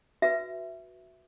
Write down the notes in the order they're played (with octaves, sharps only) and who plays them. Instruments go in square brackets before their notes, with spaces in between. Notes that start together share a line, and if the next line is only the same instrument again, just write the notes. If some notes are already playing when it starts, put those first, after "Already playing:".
[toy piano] F#4 B4 E5